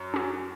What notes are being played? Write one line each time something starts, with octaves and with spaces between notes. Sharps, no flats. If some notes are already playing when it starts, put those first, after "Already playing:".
Already playing: F#2
C#4 F#4